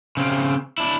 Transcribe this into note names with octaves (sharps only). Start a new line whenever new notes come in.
C#3 C4
D4 E4